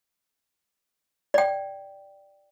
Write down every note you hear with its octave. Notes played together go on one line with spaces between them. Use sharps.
D5 G5